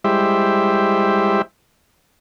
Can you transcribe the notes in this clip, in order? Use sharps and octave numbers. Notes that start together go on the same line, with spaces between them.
G3 G#3 E4 G4 C5 E5